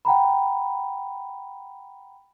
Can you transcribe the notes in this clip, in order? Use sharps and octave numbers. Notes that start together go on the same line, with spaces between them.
F#5 G5 A#5 B5